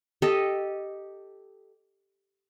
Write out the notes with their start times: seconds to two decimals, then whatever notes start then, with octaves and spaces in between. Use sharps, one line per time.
0.22 G4 A4 D#5